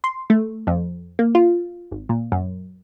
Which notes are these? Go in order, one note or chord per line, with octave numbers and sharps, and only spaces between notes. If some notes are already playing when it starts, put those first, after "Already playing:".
C6
A3
F2
A#3
F4
G#1
A#2
F#2